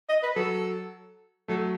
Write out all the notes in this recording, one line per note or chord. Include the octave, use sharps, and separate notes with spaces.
D#5
B4
F#3 A4
F#3 A3 A4